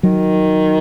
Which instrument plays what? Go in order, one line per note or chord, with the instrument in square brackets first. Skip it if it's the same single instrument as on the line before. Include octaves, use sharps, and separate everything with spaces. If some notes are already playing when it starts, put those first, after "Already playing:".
[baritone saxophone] D#3 [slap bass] F#3